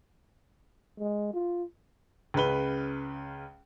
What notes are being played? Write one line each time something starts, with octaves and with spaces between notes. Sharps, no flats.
G#3
F4
C#2 C#3 B4 G7